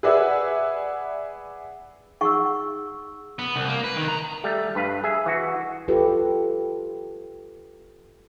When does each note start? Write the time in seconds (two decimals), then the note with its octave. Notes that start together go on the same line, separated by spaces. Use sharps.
0.03 G#4 B4 D5 E5 F#5 G#5
2.21 D#4 G#4 F#5 C#6 E6
3.39 B3
3.56 C2
3.69 A#3
3.84 B4
3.96 D#3
4.08 A#5
4.44 G3 A3
4.75 G2 B4 F5
5.04 G#4 E5 G#5
5.26 E3 F#4
5.88 F4 G4 A4 B4